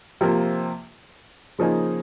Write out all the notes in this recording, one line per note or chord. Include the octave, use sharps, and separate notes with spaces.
C3 F3 A#3 F4
C#3 F3 A#3 D#4 G#4